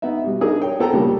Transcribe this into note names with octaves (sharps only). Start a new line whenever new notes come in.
B3 D#4 E5
B2 G3
D4 D#4 G#4 A#4
C#5 G5
B3 A4 G5 A#5
A#2 C#3 G3 G4 A#4